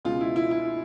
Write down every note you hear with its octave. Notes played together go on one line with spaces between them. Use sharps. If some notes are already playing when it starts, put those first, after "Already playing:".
C#2 B2 G#3 F4
E4
E4
E4